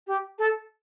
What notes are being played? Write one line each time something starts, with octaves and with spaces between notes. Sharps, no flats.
G4
A4